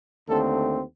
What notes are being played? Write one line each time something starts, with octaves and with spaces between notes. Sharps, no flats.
D#2 D3 A3 C4 A4